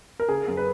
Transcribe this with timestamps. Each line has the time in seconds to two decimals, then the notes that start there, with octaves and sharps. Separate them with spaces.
0.20 A#4
0.29 C#3 G#4
0.48 F#2
0.57 B4